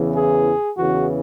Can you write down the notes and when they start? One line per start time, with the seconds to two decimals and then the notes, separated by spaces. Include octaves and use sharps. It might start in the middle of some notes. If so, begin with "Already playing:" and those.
Already playing: E2 C#3 E3
0.14 G#4
0.77 E2 C#3 E3 F#4